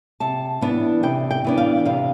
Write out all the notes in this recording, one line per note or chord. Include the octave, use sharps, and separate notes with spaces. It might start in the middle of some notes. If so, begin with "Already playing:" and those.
C3 A5
E3 B3 D4
C3 G5
G5
E3 B3 D4
F5
C3 F5